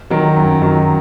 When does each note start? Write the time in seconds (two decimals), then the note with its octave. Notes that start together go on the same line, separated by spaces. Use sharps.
0.10 D#3 F#3
0.37 F#2
0.62 D#3 F#3